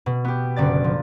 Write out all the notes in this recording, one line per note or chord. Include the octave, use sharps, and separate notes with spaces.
B2
B3 G4
F#1 D3 D5 A6
F3